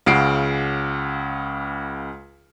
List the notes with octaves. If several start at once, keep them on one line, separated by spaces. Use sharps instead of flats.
C#2 C#3 F#5 C7 D7